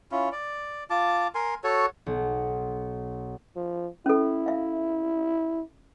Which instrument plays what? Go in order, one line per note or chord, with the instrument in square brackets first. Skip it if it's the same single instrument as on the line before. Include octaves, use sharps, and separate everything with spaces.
[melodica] C#4 E4 F4
D5
F4 A5 D6
A#4 G#5 C6
F#4 A4 C#5
[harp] B1
[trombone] F3
[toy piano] C#4 A4 [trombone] E4
[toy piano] E5 F5